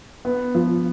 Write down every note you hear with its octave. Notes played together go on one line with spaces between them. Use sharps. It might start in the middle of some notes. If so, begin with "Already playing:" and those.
B3
F3